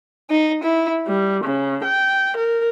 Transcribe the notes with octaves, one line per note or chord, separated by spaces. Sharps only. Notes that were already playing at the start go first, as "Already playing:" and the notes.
D#4
E4
G3
C#3
G5
A#4